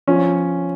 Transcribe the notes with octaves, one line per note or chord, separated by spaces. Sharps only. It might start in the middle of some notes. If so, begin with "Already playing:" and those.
F3 C#4